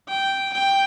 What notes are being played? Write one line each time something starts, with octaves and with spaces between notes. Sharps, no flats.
G5
G5